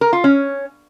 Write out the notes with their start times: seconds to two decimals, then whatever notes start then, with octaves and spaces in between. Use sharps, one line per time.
0.01 A#4
0.13 F4
0.24 C#4